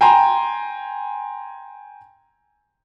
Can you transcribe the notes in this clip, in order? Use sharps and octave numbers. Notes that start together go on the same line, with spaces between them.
G5 G#5 A#5 C6